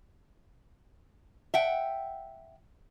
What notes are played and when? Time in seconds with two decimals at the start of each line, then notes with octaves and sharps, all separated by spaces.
1.54 E5 F#5 G5